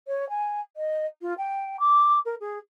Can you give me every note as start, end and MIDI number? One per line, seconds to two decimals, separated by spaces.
0.07 0.29 73
0.29 0.61 80
0.77 1.06 75
1.22 1.34 65
1.38 1.77 79
1.80 2.19 86
2.25 2.35 70
2.40 2.58 68